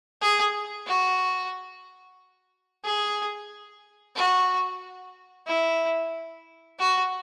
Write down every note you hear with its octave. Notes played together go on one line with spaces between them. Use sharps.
G#4
F#4
G#4
F#4
E4
F#4